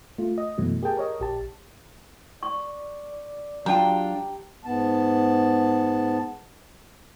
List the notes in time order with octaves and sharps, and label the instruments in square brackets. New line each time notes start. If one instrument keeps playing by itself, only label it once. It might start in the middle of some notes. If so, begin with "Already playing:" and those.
[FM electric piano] A3 F4
D#5
F#2 B2 E3 F#3 A3
G4 G#4 A#4 G5 A5
A#4 C#5 D#5
A#1 G4 A5
[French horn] D5 [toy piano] C#6
[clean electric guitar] F#3 D4 F4 [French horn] G4 [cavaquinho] G5 [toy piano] A5 A#5
[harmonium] G#2 B3 A5